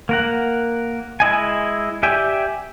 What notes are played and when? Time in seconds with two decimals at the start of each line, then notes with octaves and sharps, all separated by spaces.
0.09 A#3 A#4 F#5
1.20 G#3 E4 D#5 G#5
2.03 G4 D5 E5 G5 G#5